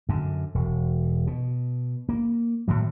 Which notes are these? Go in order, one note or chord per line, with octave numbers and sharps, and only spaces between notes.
F#2 D3
E1
B2
A#3
A2 D#3 F#3